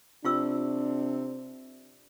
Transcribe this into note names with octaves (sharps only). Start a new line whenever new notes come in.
C3 D4 F4 C#6 E6